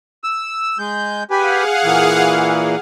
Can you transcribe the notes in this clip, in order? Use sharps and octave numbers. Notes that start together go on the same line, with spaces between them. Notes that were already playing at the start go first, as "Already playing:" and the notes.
E6
G#3 G6
G4 G#4 B4 F5 F#5 G#5
A#2 E3